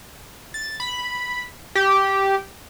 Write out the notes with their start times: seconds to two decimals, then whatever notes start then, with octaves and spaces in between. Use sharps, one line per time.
0.54 A6
0.80 B5
1.75 G4